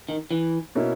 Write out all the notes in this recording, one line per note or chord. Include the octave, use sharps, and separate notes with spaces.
D#3
E3
B2 A#3 C#4 E4